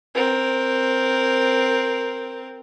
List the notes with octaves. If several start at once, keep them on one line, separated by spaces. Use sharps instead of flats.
C4 A#4